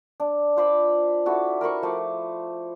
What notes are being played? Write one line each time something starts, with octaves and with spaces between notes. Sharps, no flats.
D4
F4 C5 B5 D6
E4 F#4 A4 D6
A#4 C5 B5 C#6
F3 A3 C5 D6